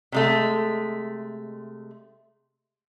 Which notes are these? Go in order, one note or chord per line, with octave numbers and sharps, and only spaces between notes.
C3 G#3 A3